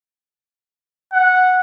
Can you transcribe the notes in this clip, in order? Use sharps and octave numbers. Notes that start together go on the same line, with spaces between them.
F#5